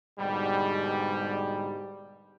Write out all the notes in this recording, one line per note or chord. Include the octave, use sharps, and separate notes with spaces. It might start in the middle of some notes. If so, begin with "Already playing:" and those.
G#2 B2 D3 G3